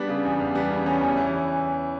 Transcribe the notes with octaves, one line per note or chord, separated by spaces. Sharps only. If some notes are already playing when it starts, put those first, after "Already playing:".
Already playing: G3 B3 D4
C#3
E2
E2
G3 B3 D4
C#3
E2 C#4
E2
E3